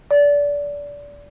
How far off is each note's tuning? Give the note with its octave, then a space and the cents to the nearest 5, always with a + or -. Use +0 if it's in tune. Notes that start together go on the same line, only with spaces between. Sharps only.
D5 -25